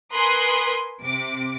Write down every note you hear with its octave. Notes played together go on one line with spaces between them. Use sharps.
A#4 B4 G#5 C6 D#6 F#6
C3 D6